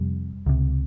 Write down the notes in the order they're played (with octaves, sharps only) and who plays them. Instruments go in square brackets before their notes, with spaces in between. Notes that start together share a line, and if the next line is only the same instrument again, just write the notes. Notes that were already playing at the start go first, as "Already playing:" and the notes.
Already playing: [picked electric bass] F2 C3 G3
C#2 C3